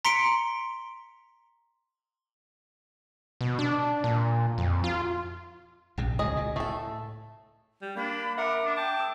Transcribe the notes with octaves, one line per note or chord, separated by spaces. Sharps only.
A#5 C6 B6 C#7 D7
B2
D4
A#2
F2
F4
A#1 G#2 C3
C#2 C#3 G#4 D#5
A#2
A2 A3 A4
G3
A#3 D4 B5
A#4 E5 F#5 A#5 B5 D6
D4
G5 A5
D#6 E6